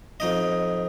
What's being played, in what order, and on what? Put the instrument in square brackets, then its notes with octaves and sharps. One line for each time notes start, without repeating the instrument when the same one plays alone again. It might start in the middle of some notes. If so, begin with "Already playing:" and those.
[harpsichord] F2 D#4 D#5